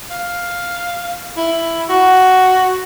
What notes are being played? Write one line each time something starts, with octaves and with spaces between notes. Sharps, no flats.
F5
E4
F#4